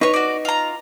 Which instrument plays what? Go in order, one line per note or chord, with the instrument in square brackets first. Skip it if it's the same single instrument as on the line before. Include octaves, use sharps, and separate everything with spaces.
[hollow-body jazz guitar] D#4 B4 [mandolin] C#5 C#6
[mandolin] F#4 D5
F4 A#5